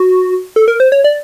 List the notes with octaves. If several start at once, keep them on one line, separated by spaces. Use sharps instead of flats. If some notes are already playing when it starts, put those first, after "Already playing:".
Already playing: F#4
A4
A#4
C5
C#5
D5